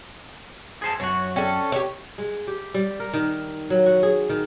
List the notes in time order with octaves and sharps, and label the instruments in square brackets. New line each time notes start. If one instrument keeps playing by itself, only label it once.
[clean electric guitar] G#4 C5 A5
[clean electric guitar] F#2 F#4 [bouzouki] C#5
[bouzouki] C#4 A4 [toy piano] D5 G5
[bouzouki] G4 C#5
[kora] G#3
G4
G3
A#4
D#3
F#3
F#4
G#4
D#3